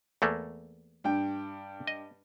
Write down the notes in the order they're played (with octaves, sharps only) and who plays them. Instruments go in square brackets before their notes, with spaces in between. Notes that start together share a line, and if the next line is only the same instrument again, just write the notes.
[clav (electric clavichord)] E2 A3 A#3
[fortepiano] G2 G5
[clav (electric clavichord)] D#5